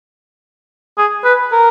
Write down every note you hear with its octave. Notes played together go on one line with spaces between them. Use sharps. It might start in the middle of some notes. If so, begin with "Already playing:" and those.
G#4
B4
A#4